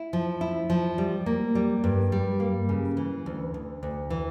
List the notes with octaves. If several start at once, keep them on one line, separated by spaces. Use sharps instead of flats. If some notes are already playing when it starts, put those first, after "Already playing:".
Already playing: E4
F3
E4
F3
G3
A#3
G3
G2
G3
A#3
C#3
E3
D2
D2
D2
E3